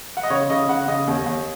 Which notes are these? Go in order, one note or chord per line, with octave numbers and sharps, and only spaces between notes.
F#5
D#5
C#3 C#5
C#3 D#5
C#3 F#5
C#3 D#5
D#2
D#2